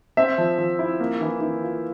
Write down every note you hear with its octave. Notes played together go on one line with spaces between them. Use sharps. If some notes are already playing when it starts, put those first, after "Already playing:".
C4 E5
F3
F3
E4
A#3
E3
E3
F4